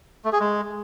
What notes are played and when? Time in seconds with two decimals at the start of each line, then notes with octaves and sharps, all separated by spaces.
0.25 A3
0.33 G#4
0.40 G#3